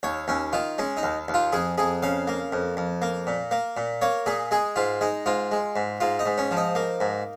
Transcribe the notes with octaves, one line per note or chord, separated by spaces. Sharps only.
D#2 C#5
D#2 C#4
D#3 F4
G#3 C#4
D#4
D#2
D#2
F4
F2 G#4
F2 G#4
C#3 F5
A#3
F2
F2
A#3
A#2
A#3
A#2
A#3 C#5
A#2 G#4
G#3 G#4
G#2 F4
G#3 D#4
G#2 F4
G#3
G#2
G#2 F4
D#4
G#2
C#4
F3
D#4
A#3
G#2